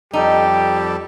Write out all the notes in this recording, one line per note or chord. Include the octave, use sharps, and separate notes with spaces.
F2 G3 D#4 G4 A4